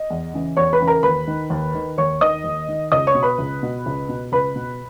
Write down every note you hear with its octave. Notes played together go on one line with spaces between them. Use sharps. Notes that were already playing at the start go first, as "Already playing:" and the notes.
Already playing: D#5
E2
C#3 E3
E2 C#5 C#6
B4 B5
C#3 E3
A#4 A#5
D#2 B4 B5
D#3
D#2
D#3
D#2 C#5 C#6
D#3 D#5 D#6
D#2
D#3
C#2 D#5 D#6
C#5 C#6
B2
B4 B5
C#2
B2
C#2
B2
C#2 B4 B5
B2